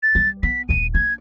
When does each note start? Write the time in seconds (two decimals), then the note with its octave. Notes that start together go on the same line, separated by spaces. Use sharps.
0.03 A6
0.15 G3
0.43 B3 B6
0.69 D#1 A3 D#7
0.94 A#3 D4 G#6